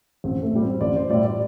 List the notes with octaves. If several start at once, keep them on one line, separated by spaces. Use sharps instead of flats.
A1 C4
A3
A2 G3
C4
A1 D5
C5
A2 G3 D5
D5